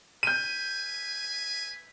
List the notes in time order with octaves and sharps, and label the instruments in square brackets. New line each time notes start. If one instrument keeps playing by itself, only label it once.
[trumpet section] B4 E5 G#5 [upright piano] G6 D#7